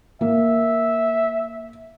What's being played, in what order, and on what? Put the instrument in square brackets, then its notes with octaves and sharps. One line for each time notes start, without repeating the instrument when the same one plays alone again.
[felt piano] A#3 [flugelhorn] E5